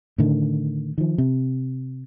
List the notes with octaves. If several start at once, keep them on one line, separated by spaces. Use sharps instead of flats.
A2 D3 D#3
D#3 F3
C3